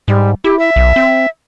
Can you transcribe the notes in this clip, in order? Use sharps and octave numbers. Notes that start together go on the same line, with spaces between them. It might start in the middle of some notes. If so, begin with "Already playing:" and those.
G#2 G3
E4 G4
E5
B1
C4